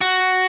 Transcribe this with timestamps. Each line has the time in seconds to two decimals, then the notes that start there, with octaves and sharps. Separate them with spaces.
0.01 F#4